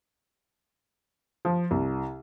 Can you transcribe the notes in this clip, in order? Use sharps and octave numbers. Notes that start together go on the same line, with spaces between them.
F3
C2